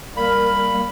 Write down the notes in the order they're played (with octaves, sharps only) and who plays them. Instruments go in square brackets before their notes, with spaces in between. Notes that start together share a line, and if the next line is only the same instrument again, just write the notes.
[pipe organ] G3 A#3 [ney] A#4 [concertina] B5